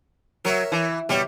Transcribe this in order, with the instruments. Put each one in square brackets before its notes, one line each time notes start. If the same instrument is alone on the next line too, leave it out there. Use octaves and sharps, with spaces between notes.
[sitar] F#3 [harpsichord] A#4 C#5 E5
[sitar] E3
[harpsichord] B2 G4 C#5 [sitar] G3